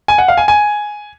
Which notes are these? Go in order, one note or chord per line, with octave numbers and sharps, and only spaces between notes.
G#5
F#5
F5
G#5
G#5